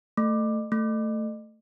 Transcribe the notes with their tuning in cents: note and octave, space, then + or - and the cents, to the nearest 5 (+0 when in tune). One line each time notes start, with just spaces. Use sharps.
A3 +10
A3 +10